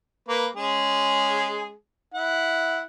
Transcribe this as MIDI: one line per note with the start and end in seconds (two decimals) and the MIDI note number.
0.29 0.47 58
0.29 0.47 71
0.56 1.71 56
0.56 1.71 61
0.56 1.71 68
2.14 2.82 64
2.14 2.82 78